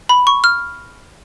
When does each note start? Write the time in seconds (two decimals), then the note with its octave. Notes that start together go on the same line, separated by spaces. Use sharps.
0.09 B5
0.27 C#6
0.44 F6